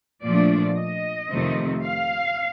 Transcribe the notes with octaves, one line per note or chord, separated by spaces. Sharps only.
A#2 F3 A3 D4 D5
D#5
F2 C3 D#3 A3 C4
F5